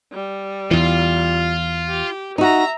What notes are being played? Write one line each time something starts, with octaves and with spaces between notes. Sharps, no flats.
G3
E2 E3 F4
G4
D#4 F#4 E5 A#5